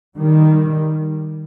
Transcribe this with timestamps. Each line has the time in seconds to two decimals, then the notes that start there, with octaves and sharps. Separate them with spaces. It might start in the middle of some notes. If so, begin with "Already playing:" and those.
0.17 D#3 G3